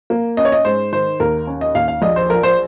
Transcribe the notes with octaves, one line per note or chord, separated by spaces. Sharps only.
A#3
C#4 D#5
C#5
D#5
G#2 C5
D#3 C5
D#2 A#4
C#4
D#5
D#2 F5
F5
A#1 D#5
C5
F3 A#4
C5